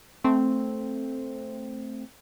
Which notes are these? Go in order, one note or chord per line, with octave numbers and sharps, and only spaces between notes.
A3 C4